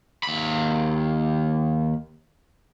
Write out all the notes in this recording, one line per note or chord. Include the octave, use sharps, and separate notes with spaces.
D#2 B5